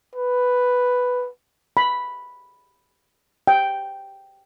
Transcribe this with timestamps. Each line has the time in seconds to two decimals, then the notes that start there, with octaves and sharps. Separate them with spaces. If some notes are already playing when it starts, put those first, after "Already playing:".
0.15 B4
1.77 B5
3.47 G5